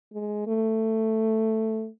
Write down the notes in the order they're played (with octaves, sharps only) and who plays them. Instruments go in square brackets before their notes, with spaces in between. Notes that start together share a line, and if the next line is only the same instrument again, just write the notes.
[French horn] G#3
A3